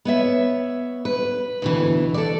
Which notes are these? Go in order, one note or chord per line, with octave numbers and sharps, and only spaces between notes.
B3 C#5 E5
B4
D2 B2 E3
A4 D5